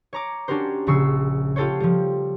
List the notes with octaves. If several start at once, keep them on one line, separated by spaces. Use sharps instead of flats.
C#5 A#5 D6
C#4 D4 F#4 G4 A#4 C5
A#1 C#3 C#6 E6 C7
F4 G4 A4 C5 C#5
F3 G3